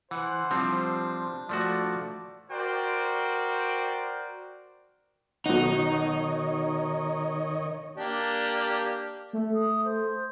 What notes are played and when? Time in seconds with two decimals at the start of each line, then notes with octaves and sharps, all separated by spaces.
0.11 E3 C5 F#5
0.51 F3 G3 C4 D4
1.49 F3 A3 F#4 D5
2.50 F#4 A#4 C5 D5 G5
5.46 B1 D#3 D#4 C#5 D#5 F#5
7.97 A#3 D4 G4
9.33 A3 A4
9.54 D#6
9.84 C5